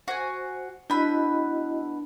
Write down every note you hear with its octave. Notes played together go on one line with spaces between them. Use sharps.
F#4 C5 G#5
B3 D4 E4 F#4 D#5 B5